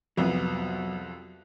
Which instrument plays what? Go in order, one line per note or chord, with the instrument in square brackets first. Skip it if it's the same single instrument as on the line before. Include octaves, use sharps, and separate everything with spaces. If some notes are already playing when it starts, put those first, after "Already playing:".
[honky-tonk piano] C2 F2 [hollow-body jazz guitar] F#3 B3